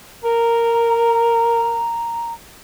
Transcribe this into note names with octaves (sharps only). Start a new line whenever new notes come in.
A#4 A#5